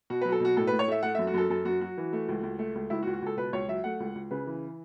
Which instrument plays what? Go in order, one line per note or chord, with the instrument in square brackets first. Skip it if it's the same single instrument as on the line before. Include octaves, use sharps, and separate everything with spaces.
[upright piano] B2 F#4
B4
F#3 F#4
A4
B2 F#4
A2 A4
B4
A2
C#5
A3 E5
A3 F#5
E5
F#2
F#4
F#2 A4
F#2 A4
F#2 F#4
F#3 F#4
E3
A3
C#2
C#2
A3
C#2
C#2 E4
F#4
C#2
F#4
C#2 A4
B2 B4
C#2 C#5
F#3 E5
A3 F#5
C#2
C#2
C#3 B4
E3